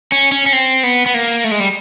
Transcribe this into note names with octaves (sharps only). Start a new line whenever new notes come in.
C#4
C#4
C#4
C4
B3
B3
A#3
A3
G#3
G3